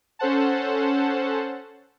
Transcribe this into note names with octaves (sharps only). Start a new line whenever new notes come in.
C#4 A4 C5 F#5 A5